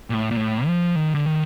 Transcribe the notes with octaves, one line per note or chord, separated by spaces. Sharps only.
A#2
A2
A#2
A2
F3
D#3
D3
D#3